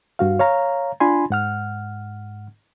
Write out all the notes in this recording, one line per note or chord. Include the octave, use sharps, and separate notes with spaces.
G2 F#4 F5
C#5 F5 A#5
D4 F4 G#5 B5 C6
G#2 F#5 F6